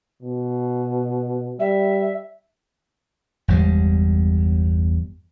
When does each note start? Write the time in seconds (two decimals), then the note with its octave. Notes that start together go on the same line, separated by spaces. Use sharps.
0.23 B2
1.60 G3 E5
3.48 G1 E2 G3 G#3